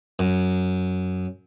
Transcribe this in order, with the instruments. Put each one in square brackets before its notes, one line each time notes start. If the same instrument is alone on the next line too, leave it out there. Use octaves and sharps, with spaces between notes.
[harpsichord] F#2